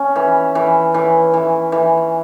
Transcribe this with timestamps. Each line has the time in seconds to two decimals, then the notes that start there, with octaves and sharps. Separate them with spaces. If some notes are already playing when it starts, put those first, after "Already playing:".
Already playing: C#4
0.16 E3
0.55 E3
0.94 E3
1.34 E3
1.72 E3